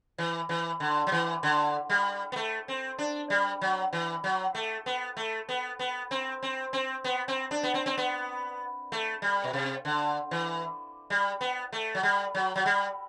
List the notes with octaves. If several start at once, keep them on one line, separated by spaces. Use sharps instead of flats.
E3
E3
D3
F#3
E3
D3
G3
B3
A3
C4
D4
G3
F#3
E3
F#3
A3
B3
A3
B3
B3
C4
C4
C4
B3
C4
D4
B3
C4
C4
B3
A3
G3
B2
C3
D3
E3
G3
B3
A3
F#3
G3
F#3
F#3
G3